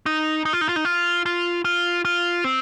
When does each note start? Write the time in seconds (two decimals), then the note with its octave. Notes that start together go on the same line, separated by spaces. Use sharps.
0.06 D#4
0.45 D#4
0.53 F4
0.61 D#4
0.69 F4
0.76 D#4
0.85 F4
1.26 F4
1.65 F4
2.05 F4
2.44 C4